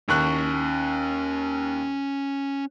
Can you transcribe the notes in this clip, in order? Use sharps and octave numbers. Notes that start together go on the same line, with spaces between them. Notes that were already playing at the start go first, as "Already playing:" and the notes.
D#2 C#4 A5 C#6 F#6